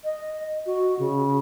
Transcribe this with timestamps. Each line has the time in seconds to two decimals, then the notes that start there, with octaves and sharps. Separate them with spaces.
0.04 D#5
0.66 F#4
0.99 C#3